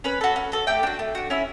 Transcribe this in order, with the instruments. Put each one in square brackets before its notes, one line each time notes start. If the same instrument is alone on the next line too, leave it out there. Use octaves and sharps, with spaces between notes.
[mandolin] C#4 B4 B5
F#4 A4
C#4
F#4 A4
A3 G4 G5
D4 F#4
A3
D4 F#4
C#4 E4 E5